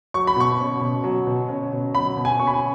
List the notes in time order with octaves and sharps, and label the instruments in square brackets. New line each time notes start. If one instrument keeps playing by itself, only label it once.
[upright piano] F#3 C#6
B5
B2 C#6
C#4
B2
F#3
B2
C#4
B2
F#3 B5
B2
G#5
C#4 C#6
B5
G#5